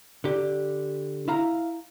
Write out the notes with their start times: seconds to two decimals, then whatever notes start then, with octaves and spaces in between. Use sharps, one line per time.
0.24 D3 G4
1.28 E4 F5 A#5